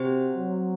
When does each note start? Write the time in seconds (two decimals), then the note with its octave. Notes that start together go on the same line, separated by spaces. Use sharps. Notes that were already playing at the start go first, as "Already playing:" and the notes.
Already playing: C3 C4 F#4 C5
0.37 F#3